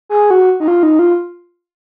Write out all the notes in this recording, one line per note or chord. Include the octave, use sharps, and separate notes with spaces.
G#4
F#4
D#4
F4
D#4
F4